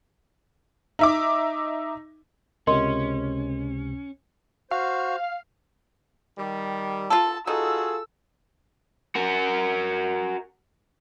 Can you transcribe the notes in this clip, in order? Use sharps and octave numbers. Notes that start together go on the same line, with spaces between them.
D#4 E5 D6
C#2 C3 C#4 A#4 D#5 C6
F#4 C5 F5
D#3 G3
F4 A4 A5
D#4 F4 F#4 G#4 A4 E6
F#4 A#4